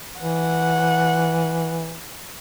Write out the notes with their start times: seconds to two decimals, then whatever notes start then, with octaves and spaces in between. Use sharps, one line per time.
0.21 E3 F#5